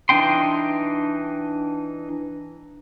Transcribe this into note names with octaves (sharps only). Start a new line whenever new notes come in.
E3 D4 D#4 G5 C6